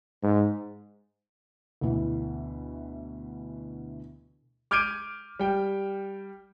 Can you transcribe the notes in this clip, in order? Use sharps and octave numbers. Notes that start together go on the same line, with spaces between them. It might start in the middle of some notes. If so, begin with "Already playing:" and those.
G#2
D2 B2 E3
D6 F6 G6 G#6 D7 D#7
G3 G5